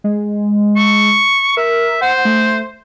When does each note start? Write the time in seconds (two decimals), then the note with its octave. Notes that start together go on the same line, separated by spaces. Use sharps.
0.04 G#3
0.76 C#6
1.57 A#4 E5
2.01 C5 F#5
2.25 A3